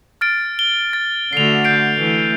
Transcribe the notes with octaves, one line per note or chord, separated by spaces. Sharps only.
F6 A6 D7
G7
A6
D3 A3 F#4 C7 F7
G6 C7 D7
E3 A3